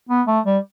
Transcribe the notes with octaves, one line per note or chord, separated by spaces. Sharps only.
B3
A3
G3